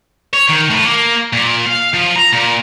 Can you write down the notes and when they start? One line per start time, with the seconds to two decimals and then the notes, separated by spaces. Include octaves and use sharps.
0.33 C#5
0.49 D#3
0.70 A2
0.85 A#3
1.33 A#2
1.66 F5
1.94 F3
2.16 A#5
2.33 A#2